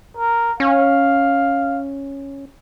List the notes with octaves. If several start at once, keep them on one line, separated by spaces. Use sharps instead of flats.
A#4
C#4 F5